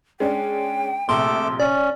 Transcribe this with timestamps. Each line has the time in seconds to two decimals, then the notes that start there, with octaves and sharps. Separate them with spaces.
0.20 G#3 C#4 D4 G5
1.09 A#1 C3 A3 A4 C6 D6
1.60 C#4 D5